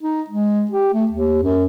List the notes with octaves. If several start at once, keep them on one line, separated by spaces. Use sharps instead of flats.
D#4
G#3
G4
A3
D#2
F#2